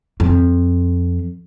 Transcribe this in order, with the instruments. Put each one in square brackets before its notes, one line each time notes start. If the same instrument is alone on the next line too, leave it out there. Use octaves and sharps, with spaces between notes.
[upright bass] F2